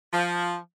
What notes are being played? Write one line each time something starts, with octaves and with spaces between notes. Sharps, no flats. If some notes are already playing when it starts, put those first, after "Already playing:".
F3